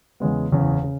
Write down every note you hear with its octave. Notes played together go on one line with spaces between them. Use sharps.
E2 C#3 G#3 B3
F#1 E2 C#3
C#3